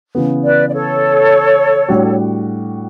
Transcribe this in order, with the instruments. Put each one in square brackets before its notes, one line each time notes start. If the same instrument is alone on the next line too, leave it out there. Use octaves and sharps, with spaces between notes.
[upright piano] C#3 E3 B3
[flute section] B4 D5
D5
A4 C#5
[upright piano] A2 G3 D4 F#4